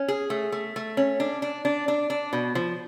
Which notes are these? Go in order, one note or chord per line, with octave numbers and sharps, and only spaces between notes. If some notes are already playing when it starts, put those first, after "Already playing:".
Already playing: C#4
G#4
A3
A3
A3
C#4
D4
D4
D4
D4
D4
B2
F3